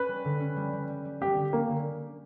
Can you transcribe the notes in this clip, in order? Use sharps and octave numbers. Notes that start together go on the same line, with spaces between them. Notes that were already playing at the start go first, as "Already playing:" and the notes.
Already playing: C#4 B4
G3
D3
C#4
G3
G3
G3
G3
G3 G4
D3
A#3 C#4
D3